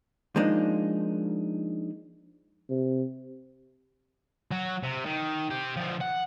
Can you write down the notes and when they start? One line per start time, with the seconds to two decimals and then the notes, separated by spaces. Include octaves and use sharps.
0.36 F3 G#3 A#3 D4 D#4
2.70 C3
4.51 F#3 F#4
4.83 C3
5.05 D#3
5.50 G4 C5
5.76 D3 F3
6.01 F#5